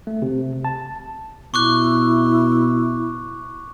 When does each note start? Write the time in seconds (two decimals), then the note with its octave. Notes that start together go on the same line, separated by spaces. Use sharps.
0.07 A3
0.22 C3
0.65 A5
1.54 B2 E4 C#6 D6 F#6